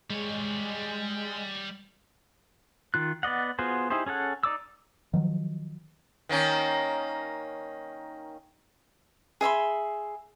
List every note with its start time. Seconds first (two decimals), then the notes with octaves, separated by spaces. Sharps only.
0.10 G3 G#3 C#5
2.94 D#3 F4 F#6
3.23 B3 D5 D#5 F#5
3.59 B3 F4 F#4 G#4 C5
3.90 D#4 E4 G4 G#4 C5
4.06 C#4 G#4 A4 F#5
4.43 D#4 D5 D6 E6
5.14 D#3 F3 F#3
6.29 D#3 A#3 C#4
9.41 G#4 E5 B5 C6